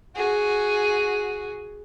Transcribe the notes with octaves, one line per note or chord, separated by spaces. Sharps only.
F#4 G#4